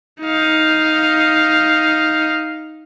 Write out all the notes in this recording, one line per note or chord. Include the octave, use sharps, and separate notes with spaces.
D#4 F5